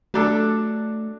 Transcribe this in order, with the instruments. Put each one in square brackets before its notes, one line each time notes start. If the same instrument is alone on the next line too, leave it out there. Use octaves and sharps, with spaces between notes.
[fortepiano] F#3 D4 A4 [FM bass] A3